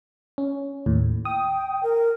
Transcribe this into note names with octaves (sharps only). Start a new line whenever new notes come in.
C#4
D#2 A2
G5 D#6
A#4